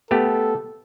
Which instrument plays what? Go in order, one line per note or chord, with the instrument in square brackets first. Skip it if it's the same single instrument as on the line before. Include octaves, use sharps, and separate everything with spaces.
[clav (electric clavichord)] A3 B3 G4 [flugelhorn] A4